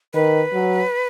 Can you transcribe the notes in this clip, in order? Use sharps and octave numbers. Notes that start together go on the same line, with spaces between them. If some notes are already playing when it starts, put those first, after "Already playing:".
D#3 B4
F#3